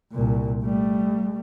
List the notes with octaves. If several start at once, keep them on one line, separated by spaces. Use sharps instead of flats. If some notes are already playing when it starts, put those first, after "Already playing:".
C2 A#2
G3 A3